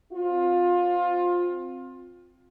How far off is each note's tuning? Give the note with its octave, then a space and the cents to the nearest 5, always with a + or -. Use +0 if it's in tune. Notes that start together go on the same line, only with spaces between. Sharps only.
C4 +0 F4 +20